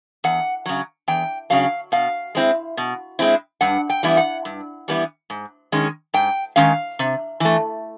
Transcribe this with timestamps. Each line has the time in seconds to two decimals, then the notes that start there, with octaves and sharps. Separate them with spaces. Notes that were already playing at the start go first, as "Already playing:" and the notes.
0.24 E2 F#5
0.66 C#3 F#3
1.08 E2 G5
1.50 C#3 F#3 F5
1.92 B2 F5
2.35 G#3 C4 E4
2.77 B2
3.19 G#3 C4 E4
3.61 G2 F#5
3.90 G5
4.03 E3 G3 B3 E4
4.17 F#5
4.45 G2
4.88 E3 G3 B3 E4
5.30 G#2
5.72 D#3 G#3 C#4
6.14 G#2 G5
6.56 D#3 G#3 C#4 F5
6.99 C3
7.40 E3 A3